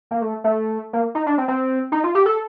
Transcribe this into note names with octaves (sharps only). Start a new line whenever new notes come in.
A#3
A3
A3
A#3
D#4
D4
C4
C4
D#4
F4
G4
A4